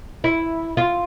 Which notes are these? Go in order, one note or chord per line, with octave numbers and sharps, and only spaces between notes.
E4
F4